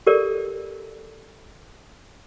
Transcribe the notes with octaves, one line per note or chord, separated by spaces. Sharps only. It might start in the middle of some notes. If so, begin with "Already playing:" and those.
G4 A4 A#4 D5